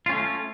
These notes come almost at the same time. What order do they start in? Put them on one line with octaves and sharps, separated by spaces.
F4 C#4 A3